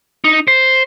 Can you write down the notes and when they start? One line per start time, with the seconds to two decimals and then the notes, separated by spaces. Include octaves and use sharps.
0.24 D#4
0.48 C5